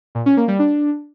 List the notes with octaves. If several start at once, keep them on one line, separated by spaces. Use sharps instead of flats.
A#2
C#4
A#3
G3
D4